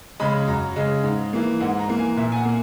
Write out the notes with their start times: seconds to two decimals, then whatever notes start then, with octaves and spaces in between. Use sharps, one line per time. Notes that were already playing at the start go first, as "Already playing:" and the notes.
0.20 C#3 G#3 B5
0.47 F#2 A#5
0.76 C#3 G#3
1.04 G#2
1.33 E3 A#3
1.60 G#2 F#5
1.79 A#5
1.88 E3 A#3
1.99 G#5
2.17 A#2 E5
2.32 G#5
2.36 F#5
2.45 A#3